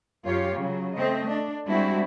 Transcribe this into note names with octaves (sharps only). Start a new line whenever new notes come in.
F#2 F4 G4 C#5 F5
C#3 F#3
A3 C4 D#5
D4
G3 G#3 C4 D4 E4 F#4